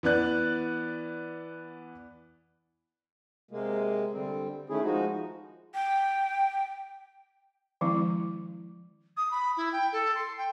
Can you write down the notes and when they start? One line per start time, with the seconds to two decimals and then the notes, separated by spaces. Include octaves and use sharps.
0.03 E3 B3 D5 F#6
3.51 C3 G#3 A#3
4.12 D3 G3 C4
4.69 D#3 A3 C#4 E4 G#4
4.82 F3 G#3 D#4 F#4
5.74 G5
7.81 D#3 F3 G#3 C4 E4
9.17 D#6
9.31 B5
9.57 E4
9.72 G5
9.92 A4
10.15 C6
10.38 G5